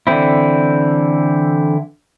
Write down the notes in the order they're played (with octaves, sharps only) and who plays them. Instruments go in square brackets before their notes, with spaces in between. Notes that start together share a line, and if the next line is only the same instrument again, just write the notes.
[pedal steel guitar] D3 E3 C4 E4